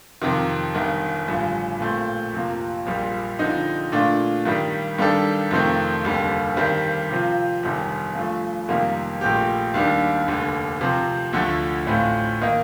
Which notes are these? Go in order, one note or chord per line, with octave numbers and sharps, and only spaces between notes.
F2 C3 D#3
G1 G2 D#3
A1 G2 D3 F3
A#2 A3 C4
F2 C3 F3 A#3
A#1 A#2 G3
D3 F3 C4 D#4
A#2 A3 D4 F4
G2 D#3 G3
G2 D#3 G3 D4 A4
F2 C3 D#3 A3 C4
F1 D#2 D3 G3
G2 D#3 G3 C4
C3 F3 C4 F4
G1 F2 C3 D#3 G3
G2 F3 A3
F2 C3 D#3 G3 A#3
A#1 A#2 A3 C4 G4
D#2 D#3 G3 D4
F1 D#2 D3
C3 F3 C4
D2 D3 F3 A3
A1 A2 A3 C4 F4
D#3 A#3 D#4